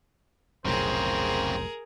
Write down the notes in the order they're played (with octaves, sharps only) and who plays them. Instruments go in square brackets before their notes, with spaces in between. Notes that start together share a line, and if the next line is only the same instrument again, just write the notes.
[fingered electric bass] F1 B1 A2 [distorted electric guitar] C#3 C4 [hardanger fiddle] G#4 A#4 [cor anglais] C5